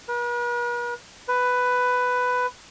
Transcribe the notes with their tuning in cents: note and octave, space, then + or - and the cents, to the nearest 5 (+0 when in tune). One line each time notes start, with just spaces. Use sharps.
B4 -45
B4 +10